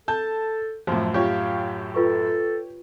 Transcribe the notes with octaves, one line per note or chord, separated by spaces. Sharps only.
A4 A5 G6
F#2 A2 F3
C#4 F4 G4 C#5 F5 B5
F4 A4 B4 C#6